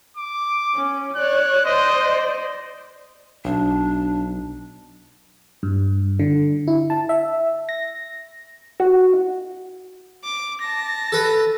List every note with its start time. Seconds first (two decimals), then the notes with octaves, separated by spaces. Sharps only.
0.17 D6
0.74 C#4
1.16 C#5 D5 F#6
1.66 C5 D5 D#5
3.45 B1 D4
5.63 G2
6.19 D3
6.67 E4
6.90 A5
7.09 E5
7.69 A#6
8.80 F#4
10.24 D6
10.61 A5 A#6
11.12 A4 B4